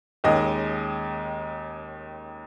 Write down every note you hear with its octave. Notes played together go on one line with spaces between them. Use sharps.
D#2 D#3 G#3 C#4 D#5